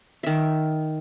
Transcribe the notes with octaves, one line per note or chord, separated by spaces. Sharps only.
D#3 E5